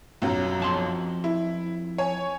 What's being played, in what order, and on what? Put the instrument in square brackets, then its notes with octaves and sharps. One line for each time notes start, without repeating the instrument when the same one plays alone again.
[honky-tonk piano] B1 F#2 F#3
[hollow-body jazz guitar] F2 A5 C6
[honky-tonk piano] E4
C#5 G#5